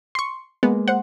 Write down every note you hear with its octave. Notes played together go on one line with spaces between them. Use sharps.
C6 C#6
G#3 A#3 B3
C5 F#5